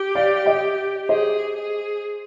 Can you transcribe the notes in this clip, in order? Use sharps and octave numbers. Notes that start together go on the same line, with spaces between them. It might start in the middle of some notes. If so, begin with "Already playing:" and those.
Already playing: G4
D5 F5
D#5 G5
G#4 C5 D#5
G#4